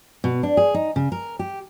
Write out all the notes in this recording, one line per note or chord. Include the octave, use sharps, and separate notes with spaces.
B2
D4
G#4
D#4
C#3
A#4
G4